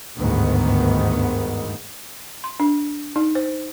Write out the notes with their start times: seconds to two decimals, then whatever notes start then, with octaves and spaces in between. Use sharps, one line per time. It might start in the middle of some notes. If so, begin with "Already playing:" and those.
0.18 G1 D2 G#2 D#3 B3
2.44 C6
2.60 D4
3.16 D#4
3.35 C5